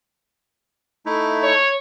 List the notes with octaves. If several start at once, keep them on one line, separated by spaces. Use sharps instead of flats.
A3 D#4 E4
C#5